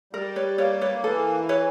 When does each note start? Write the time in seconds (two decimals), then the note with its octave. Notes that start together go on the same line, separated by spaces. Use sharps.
0.13 G3 A#4
0.36 B4 C#5
0.58 A#3 B4 C#5
0.81 B4 C#5
1.04 E3 A4
1.49 B4 C#5